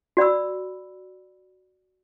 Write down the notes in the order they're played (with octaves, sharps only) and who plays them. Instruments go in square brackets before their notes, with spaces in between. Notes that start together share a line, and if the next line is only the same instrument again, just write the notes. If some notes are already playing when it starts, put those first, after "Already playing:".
[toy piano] F#4 D5 B5 E6